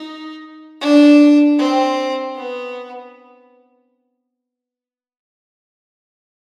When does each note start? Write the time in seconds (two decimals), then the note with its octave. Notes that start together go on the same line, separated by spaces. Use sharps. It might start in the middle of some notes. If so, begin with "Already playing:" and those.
Already playing: D#4
0.81 D4
1.58 C4
2.36 B3